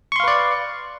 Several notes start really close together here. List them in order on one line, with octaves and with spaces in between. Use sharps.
C#6 C6 F5 B4 D5